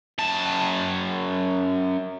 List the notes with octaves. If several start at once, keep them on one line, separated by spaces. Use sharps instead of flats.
F#2 A5